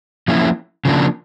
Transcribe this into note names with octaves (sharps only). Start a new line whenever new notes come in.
F3 A#3 C#4 E4
C#3 F3 A#3 D4